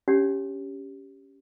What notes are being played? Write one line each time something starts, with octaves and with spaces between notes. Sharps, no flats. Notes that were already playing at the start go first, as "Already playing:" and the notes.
C#4 D4 G4 C#5